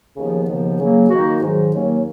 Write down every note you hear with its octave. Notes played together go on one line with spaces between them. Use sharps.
D#2 C#3 F3 B3
D#2 C#3 F3 B3
C#3 F#3 A#3
D#3 A#3 D#4 F#4
G#2 D#3 F#3
D#2 D#3 F#3 A#3 C#4